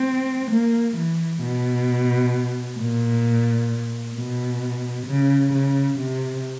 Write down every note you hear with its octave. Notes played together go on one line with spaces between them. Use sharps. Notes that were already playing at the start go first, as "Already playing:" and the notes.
Already playing: C4
A#3
E3
B2
A#2
B2
C#3
C#3
C3